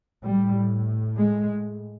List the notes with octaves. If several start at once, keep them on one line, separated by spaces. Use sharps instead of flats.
A2 G3
G#3